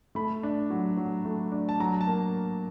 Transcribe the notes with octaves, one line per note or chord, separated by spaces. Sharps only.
A3 B5
D4
F#3
F#3
A3
D4
A5
F#3 A#5
A5
A#3